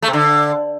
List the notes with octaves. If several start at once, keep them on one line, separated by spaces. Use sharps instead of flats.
A3
C3
D3